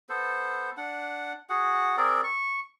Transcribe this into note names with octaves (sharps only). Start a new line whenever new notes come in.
B3 A4 C5
D4 F#5
F#4 G#4 F#5
C4 G#4 A#4 D5
C#6